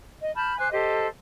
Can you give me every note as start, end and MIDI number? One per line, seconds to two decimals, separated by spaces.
0.22 0.33 75
0.36 0.57 81
0.36 0.57 83
0.36 0.57 89
0.36 0.57 91
0.58 0.71 72
0.58 0.71 80
0.58 0.71 86
0.58 0.71 90
0.73 1.06 67
0.73 1.06 69
0.73 1.06 72
0.73 1.06 75